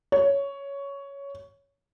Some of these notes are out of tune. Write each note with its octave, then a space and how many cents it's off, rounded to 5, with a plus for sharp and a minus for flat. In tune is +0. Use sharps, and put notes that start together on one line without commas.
C#5 +10